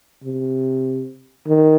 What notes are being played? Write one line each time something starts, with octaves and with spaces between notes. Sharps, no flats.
C3
D#3